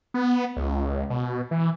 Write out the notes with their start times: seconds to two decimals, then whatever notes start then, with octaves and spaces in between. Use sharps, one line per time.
0.14 B3
0.57 C#2
1.10 B2
1.51 E3